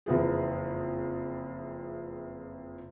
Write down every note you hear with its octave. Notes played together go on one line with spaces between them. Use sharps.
F#1 F2 E3 G#4